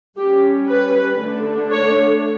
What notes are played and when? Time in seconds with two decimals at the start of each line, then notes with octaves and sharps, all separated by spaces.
0.17 G3 C#4 G4
0.69 B4
1.20 D3 A3 D4
1.71 C#5